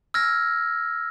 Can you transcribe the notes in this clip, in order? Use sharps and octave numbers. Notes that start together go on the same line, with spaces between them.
E6 F6 G#6 A#6